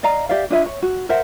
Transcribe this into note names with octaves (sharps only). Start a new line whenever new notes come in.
D5 D#5 F5 A#5
G4 D5 E5 F5
D4 F4 D#5 E5
C#5
F#4
A#4 C5 E5 F#5